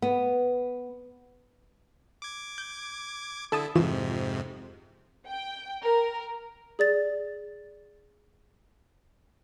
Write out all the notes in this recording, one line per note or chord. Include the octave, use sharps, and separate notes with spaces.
B3
D6 G#6
G6
D3 E4 A4 A5 D#6
F2 G#2 C3 E3 F4 E7
G5
A#4
G#4 D5 A6